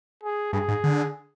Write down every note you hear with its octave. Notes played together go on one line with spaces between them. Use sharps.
G#4
G2 G#4
G#2
D3